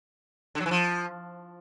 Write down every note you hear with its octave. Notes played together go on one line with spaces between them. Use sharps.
D3
F#3
E3
F3